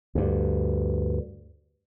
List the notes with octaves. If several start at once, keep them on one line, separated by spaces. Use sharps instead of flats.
D2 G2